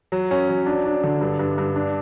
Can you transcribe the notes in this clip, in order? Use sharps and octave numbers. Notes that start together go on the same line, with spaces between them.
F#3
C#4
F#3
D4
D4
D3
G2
G2
G2
D4